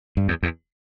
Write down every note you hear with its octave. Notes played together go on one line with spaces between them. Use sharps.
G2
E2
E2